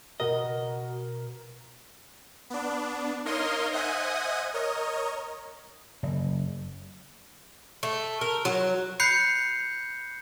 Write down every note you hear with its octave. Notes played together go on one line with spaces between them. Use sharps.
B2 F#4 A#4 D#5
B3 D4
D#4 A#4 C#5 D#5 F5 C6
C5 D#5 E5 F#5 G#5 D#6
A#4 C#5 D#5
F#1
A3
A#4
F#3
B5 F#6 G6 C7 C#7